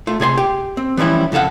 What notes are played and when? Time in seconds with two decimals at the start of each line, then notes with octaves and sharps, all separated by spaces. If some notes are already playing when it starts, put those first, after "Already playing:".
0.07 A3 F4
0.20 C3 G#4 C#5 C6
0.37 G4
0.77 C4
0.97 E3 F3 G3 C#4 E4
1.32 F2 C#3 A4 F5 F#5